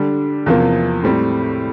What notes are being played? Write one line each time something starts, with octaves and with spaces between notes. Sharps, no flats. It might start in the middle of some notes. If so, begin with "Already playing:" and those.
Already playing: D3 G3 D4
E2 C3 F3 A#3
A2 G3 C4